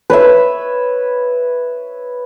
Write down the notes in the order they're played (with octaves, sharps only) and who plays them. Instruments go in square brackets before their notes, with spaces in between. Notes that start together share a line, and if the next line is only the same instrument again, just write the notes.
[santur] B4 C#5 E5